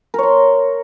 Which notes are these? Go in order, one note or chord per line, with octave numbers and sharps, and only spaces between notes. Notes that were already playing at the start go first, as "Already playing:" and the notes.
A#4 C#5 C6